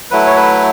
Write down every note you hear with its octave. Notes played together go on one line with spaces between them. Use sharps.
F#3 A3 E4 B4
C#5
B4